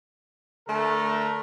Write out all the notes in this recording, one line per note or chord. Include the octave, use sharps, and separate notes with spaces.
D3 A3 A#4